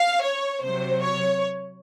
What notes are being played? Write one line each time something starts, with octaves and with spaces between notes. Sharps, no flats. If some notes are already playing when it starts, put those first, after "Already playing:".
Already playing: F5
C#5
C3 F#3 C5
C#5